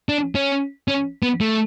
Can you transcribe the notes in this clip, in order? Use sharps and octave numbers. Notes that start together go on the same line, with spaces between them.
D4
C#4
C#4
B3
A3